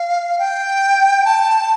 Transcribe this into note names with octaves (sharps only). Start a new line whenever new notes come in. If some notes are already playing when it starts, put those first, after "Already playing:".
Already playing: F5
G5
A5